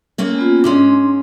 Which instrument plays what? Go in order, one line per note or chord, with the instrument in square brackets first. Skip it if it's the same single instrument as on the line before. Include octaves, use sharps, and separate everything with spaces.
[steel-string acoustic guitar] A#3 C4 C#4
[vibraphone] B3 F4
[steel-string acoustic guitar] G#2 G#3 C#4 [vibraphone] D4 C6